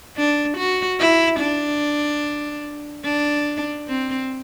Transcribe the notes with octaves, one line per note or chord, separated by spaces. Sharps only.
D4
F#4
E4
D4
D4
C4